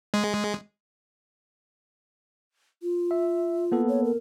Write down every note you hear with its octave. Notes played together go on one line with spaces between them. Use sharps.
G#3
F4
E5
A#3 B3 A4
C#5
A#4